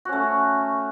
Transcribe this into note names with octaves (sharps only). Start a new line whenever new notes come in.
A3 C#4 F#4